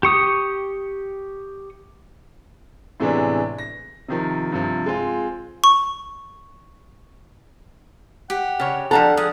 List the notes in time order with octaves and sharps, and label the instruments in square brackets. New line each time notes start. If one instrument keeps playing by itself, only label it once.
[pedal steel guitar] G4 C#6 D#6
[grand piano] A2 C3 E3 G#3 B3 D4
A#6
C3 D#3 F3
G2 C3 F3
G#3 C4 F4
[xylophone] C#6
[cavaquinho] G4 [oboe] F#5
[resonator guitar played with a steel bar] C#3 C#5
[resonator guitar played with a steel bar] F3 D4 A#5 [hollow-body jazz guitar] A4 [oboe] F#5
[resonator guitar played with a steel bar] F3 [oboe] G#4 [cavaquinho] F#5